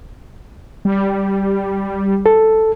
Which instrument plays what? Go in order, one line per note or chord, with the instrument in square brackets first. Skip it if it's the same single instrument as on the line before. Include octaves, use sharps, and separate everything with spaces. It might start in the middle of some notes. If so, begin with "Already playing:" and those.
[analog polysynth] G3
[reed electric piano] A4